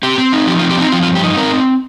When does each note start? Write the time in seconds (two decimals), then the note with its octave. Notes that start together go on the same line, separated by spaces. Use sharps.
0.03 C4 G4
0.18 C4
0.33 D#4
0.47 F3 G4
0.59 F4
0.62 C4
0.70 G4
0.77 C4 D#4
0.92 F3 F4
1.03 F4
1.07 G2
1.15 G4
1.23 D#4
1.37 C4 A#4